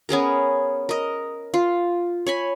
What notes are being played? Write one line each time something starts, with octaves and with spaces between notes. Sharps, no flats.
B3 C#4 G#4 A#4
A#4 D#5
F4
C#5 G#5 B5